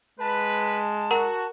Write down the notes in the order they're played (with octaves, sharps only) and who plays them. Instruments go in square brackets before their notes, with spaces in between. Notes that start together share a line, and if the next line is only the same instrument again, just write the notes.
[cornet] G#3 [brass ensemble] B4 [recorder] A5
[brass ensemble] F#4 [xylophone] A#4 F#5 A#5